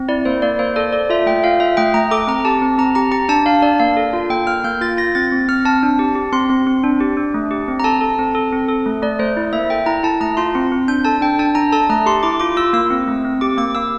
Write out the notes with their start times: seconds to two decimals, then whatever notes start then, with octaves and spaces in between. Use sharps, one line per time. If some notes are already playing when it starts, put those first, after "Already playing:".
Already playing: C4
0.08 E4 D5
0.25 A#3 C5
0.42 A#3 D5
0.59 A#3 C5
0.76 A4 D5
0.92 A4 D5
1.10 F4 E5
1.26 A3 G5
1.44 F4 F5
1.60 F4 E5
1.77 A3 G5
1.94 A3 A#5
2.11 A4 D6
2.27 C4 A#5
2.45 G4 A5
2.62 C4
2.78 C4 A#5
2.95 G4 A#5
3.12 G4 A#5
3.29 D4 A5
3.46 D4 F5
3.62 D4 D5
3.80 A#3 F5
3.97 A4
4.13 F4
4.30 A#3 G5
4.47 A#3 F6
4.64 A#3 G6
4.81 F4 A6
4.98 F4 A#6
5.15 C4 A6
5.32 C4
5.49 C4 F6
5.65 C4 A5
5.83 D4
5.99 G4
6.15 G4
6.32 C4 C6
6.50 C4
6.67 C4
6.84 D4
7.01 G4
7.17 D4
7.34 A3
7.51 G4
7.68 C4
7.80 A#5
7.84 A4 A5
8.01 A4
8.19 C4
8.35 A4
8.53 C4
8.68 A4
8.86 A3
9.02 A3 D5
9.19 A3 C5
9.37 E4
9.53 A#3 E5
9.70 A4 G5
9.86 E4 A#5
10.03 E4 A5
10.21 A3 A#5
10.37 F4 C6
10.55 C4
10.72 C4
10.88 D4 G6
11.05 A4 A5
11.21 D4 G5
11.39 D4 A5
11.55 D4 A#5
11.72 A4 A5
11.89 A3 A#5
12.06 G4 C6
12.23 E4 D6
12.40 F4 D6
12.57 F4 E6
12.73 A#3 E6
12.90 C4
13.08 A3
13.25 C4
13.41 G4 D6
13.57 A#3 D6
13.75 A#3 E6